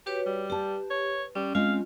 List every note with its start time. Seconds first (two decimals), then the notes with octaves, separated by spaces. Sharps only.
0.06 F#4 G4 B4 C#5
0.26 G3
0.50 G4 B4 A5
0.90 C#5
1.35 G3 C#4
1.55 G#3 C4 C#4 F4 F5